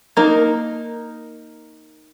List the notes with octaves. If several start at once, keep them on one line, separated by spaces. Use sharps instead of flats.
A#3 D#4 A#4